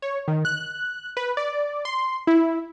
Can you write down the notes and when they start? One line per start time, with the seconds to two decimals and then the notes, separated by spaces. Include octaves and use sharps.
0.02 C#5
0.28 D#3
0.45 F#6
1.17 B4
1.37 D5
1.85 C6
2.27 E4